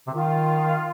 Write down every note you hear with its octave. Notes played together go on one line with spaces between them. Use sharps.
C3
D#3 F4